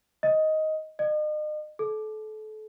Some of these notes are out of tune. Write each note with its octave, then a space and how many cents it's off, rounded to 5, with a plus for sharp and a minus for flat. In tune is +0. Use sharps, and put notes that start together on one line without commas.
D#5 +10
D#5 -40
A4 -30